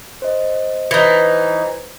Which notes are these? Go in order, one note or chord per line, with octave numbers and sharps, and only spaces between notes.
C5 D#5
E3 D#4 B4 C5